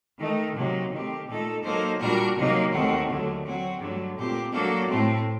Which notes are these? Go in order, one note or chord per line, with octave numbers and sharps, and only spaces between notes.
D#3 A3 D#4
C3 F#3 A#3 D#4
D#3 A3 C4 G4
A#2 A3 D#4 A4
F#3 A#3 D#4 A4 C5
A#2 G3 D4 F#4 A#4
C3 F#3 A#3 D#4
D#2 D#3 A3 C4 F#4
D#2 D3 F#3 A3
F#3 C4 F#4
G2 D3 F#3 A3
A#2 A3 C4 G4
F#3 A#3 D4 F#4 A4
A2 A3 C4